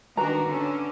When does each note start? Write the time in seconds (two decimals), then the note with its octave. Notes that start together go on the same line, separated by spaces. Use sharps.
0.17 D#3 D4 F#4 B4 A#5
0.48 D3 C#4